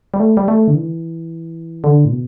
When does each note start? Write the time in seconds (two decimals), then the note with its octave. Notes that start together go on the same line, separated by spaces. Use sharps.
0.14 G3
0.20 A3
0.37 G3
0.48 A3
0.68 D3
0.75 E3
1.84 D3
2.05 A2
2.11 B2